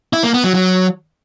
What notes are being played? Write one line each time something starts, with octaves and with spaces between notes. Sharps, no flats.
E4
A#3
B3
F#3
F#3